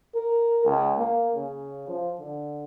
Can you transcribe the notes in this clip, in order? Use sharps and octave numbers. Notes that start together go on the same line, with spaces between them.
A#4
C#2
A#3
C#3
F3
D3